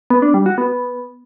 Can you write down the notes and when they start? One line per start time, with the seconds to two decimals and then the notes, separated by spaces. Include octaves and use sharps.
0.10 B3
0.22 D4
0.34 G3
0.46 F#4
0.58 B3